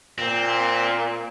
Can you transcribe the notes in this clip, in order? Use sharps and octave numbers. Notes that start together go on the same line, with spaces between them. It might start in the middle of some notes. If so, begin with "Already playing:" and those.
A#2 C4